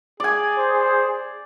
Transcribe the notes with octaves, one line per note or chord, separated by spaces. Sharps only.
G#4 D5 G#5
C5